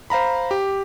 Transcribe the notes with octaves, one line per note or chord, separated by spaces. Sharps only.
C5 F5 A#5 B5
G4